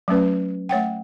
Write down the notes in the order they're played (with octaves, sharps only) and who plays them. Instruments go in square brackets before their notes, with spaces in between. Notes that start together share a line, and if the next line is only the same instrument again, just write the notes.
[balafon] F#3 A3 C#4 B4
A3 C#5 F#5 G5